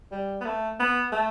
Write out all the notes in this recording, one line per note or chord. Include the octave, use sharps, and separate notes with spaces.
G3
B3
A3
B3
A3